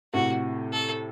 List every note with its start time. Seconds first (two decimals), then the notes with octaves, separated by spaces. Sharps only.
0.14 A2 C3 F#4
0.72 A4